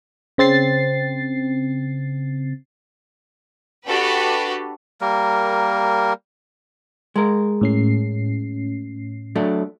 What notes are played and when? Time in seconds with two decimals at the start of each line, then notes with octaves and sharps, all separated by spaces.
0.38 C#3 C4 A6 C7
3.87 D4 F#4 G4 A4 B4
5.01 G3 A#3 A#4
7.16 G#3 A#4
7.61 A2 C#4 C7
9.36 F#3 A3 D4